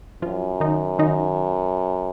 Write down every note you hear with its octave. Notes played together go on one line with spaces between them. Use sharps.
F#2 F3 F4
D#3 D#4
D#3 D#4